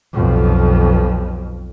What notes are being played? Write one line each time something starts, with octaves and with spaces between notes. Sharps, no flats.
B1 F2